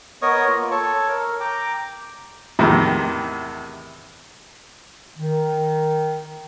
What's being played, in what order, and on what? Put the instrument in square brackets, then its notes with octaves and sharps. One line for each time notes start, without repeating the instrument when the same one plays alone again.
[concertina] B3 A#4 C#5 D#5 C#6 D#6
A#3 F4
A4 C#5 A5 C#6
A#4
G5 A#5 D6
[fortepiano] E2 A2 C3 D#3
[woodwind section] D#3